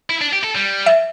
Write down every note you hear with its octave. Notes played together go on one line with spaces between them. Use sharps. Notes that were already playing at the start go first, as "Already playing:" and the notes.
E4
D4
G4
A4
G3
E5